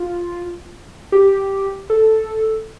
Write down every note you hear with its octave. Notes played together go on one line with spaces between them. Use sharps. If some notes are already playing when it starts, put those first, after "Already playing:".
Already playing: F4
G4
A4